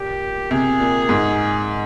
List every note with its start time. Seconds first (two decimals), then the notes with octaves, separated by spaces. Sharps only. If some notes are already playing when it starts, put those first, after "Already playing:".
Already playing: A#2 G4
0.51 C3 G#4
0.80 A#2
1.09 G#2